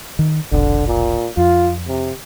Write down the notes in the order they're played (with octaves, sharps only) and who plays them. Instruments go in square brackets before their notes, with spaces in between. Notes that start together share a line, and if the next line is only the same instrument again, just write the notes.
[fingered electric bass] D#3
[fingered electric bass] F1 B1 [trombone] D3
[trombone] A#2
[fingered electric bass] F2 [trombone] F4
[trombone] C3